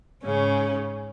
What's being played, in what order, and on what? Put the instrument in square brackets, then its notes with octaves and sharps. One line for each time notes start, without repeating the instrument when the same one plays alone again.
[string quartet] G#2 C#3 C#4